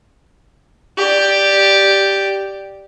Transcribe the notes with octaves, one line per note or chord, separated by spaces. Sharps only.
G4 D5